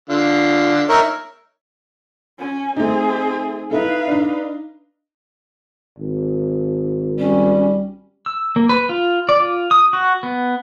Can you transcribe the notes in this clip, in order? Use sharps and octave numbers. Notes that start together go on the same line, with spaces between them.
D3 F4
D#4 A#4 C#5 E5
C#4 G#5
A3 C4 D#4 G#4
D#4 E4 A4 B4 F5
D4 D#4
G#1
G3 C#4
E6
A#3
B4
F4
D5
F4
D#6
F#4
B3